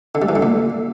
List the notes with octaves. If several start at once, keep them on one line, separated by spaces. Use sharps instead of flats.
D3
G3
E3
D3
A#2